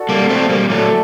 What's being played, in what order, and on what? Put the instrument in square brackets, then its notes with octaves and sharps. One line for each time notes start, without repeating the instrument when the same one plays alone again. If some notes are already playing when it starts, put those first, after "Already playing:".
Already playing: [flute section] F#4 A4 D5
[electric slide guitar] G3 A#3
A3 C4
G3 A#3
[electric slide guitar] F#3 A3 [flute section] F#4 A4 D5